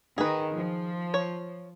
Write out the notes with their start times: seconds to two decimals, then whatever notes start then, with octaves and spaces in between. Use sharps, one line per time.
0.18 D#3 G#4 B4
0.56 F3
1.14 C#5